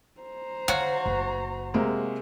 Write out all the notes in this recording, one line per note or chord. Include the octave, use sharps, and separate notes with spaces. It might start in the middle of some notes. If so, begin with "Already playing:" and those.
C5 A#5
D3 F#4 C#5 F5
F#1
C3 G#3 A#3